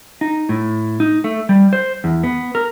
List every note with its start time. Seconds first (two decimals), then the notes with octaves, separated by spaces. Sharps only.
0.21 D#4
0.49 A2
1.00 D#4
1.24 A3
1.49 G3
1.73 C5
2.04 E2
2.23 B3
2.55 A#4